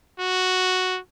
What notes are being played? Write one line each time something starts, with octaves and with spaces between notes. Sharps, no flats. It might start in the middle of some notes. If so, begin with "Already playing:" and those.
F#4